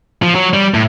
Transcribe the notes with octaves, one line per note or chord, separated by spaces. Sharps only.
F3
F#3
G3
A2